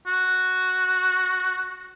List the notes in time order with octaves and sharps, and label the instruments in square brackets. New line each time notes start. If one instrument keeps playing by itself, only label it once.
[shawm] F#4